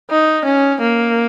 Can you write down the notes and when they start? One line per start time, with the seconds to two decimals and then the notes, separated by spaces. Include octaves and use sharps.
0.11 D#4
0.45 C#4
0.81 A#3